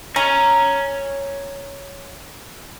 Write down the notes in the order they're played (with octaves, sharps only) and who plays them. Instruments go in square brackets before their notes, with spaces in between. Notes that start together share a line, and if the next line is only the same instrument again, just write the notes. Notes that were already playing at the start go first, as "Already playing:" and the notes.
[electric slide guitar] C#5 G#5 [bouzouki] A#5